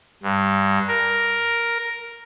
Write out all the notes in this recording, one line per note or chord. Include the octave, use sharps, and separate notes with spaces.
G2
A#4